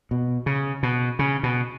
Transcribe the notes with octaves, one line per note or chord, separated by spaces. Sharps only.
B2
C#3
B2
C#3
B2